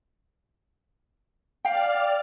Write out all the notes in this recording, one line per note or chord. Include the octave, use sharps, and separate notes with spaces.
D5 F5 G5 F6